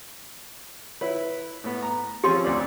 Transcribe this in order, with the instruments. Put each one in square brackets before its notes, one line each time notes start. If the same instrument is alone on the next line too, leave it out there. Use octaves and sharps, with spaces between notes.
[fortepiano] E4 B4 [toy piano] C#5
[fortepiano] A2 B3
A#5
[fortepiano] F3 C4 C#4 [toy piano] G4 D#5 C6
[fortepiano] D2 C4 D5